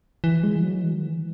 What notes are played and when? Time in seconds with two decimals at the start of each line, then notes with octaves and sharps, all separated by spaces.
0.24 E3
0.43 G#3
0.56 E3
0.63 F#3
0.83 E3
0.93 D#3
1.03 E3